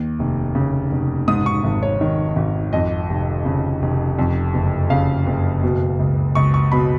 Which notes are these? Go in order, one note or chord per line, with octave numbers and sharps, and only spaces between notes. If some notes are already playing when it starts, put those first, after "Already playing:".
Already playing: D#2
F1
C#3
F1
G#2 D#6
C#6
G#1
C#5
D#3
G#1
F2 D#5
F1
C#3
F1
F2
F#1
C#3 F5
F#1
B2
C#2
C#2 C#6
C#6
B2 B5